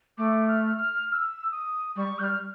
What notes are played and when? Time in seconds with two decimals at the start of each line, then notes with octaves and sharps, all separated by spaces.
0.18 A3 D6
0.48 F6
0.78 F6
1.08 F6
1.12 E6
1.52 D#6
1.96 G3 C#6
2.18 G3 G6
2.24 F6